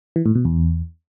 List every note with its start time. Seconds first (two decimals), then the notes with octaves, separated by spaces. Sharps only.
0.16 E3
0.26 A2
0.35 B2
0.45 E2